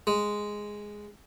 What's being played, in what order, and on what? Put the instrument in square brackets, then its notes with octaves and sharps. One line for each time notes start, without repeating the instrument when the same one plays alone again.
[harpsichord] G#3